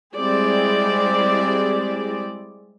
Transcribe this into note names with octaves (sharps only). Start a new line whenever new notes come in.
G3 G#3 C4 E4 G#4 D5